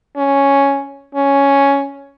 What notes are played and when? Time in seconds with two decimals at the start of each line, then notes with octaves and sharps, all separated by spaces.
0.17 C#4
1.15 C#4